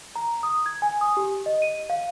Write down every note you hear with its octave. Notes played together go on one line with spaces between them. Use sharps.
A#5
D#6
G#6
G#5
D#6
G4
D#5
D#7
F5